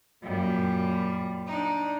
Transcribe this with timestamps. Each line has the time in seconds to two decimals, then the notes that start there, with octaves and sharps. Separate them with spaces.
0.23 F#2 A#2 G3
1.46 D4 D#4